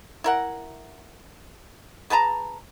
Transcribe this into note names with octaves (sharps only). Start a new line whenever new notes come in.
E4 A#4 F#5
G#4 B4 A5 A#5